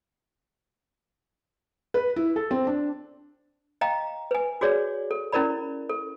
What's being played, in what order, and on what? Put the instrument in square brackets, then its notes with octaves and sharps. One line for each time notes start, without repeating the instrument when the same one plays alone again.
[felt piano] B4
E4
A4
C4
D4
[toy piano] D#5 F5 G5 A#5
B4 G#5
F#4 G#4 C#5 D5
A4
C#4 E4 A#4 D5 B5
A4